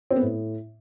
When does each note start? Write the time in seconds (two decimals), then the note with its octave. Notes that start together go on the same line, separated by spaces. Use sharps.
0.11 C4
0.16 B3
0.22 A2